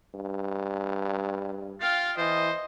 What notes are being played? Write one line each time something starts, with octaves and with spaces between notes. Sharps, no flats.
G2
F4 F5 G5
E3 C5 D#5